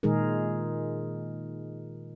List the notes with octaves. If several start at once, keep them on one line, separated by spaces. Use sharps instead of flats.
A#2 D#3 G#3 D#4 G#4 A#4